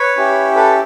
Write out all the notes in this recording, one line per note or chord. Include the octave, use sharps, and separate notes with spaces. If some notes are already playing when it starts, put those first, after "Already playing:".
Already playing: B4 C#5
C#4 E4 G4
A4 B4